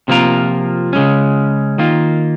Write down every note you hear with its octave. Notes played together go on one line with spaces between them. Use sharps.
C3 F3 A#3 F4 A#4
C#3 G#3 C#4
D#3 A#3 F4